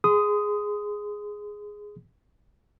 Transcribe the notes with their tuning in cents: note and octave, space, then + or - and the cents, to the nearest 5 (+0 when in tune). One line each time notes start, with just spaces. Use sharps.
G#4 +0 C6 -35 D#6 +5